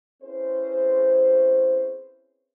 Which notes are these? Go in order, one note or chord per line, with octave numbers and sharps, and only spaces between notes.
C4 C#4 E4 G#4 B4 C5